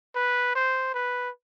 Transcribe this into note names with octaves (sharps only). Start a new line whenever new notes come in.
B4
C5
B4